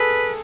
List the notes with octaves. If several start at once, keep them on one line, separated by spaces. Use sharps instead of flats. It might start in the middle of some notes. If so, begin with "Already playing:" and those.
Already playing: G#4 A4 B4